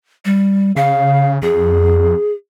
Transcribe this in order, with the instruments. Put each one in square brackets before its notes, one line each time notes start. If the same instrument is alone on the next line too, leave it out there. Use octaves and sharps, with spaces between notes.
[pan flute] G3
[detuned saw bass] C#3 [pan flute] F5
[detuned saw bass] F2 [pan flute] G#4